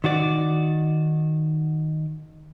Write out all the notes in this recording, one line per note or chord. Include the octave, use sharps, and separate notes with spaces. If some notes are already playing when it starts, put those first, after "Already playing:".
D#3 F#4 D5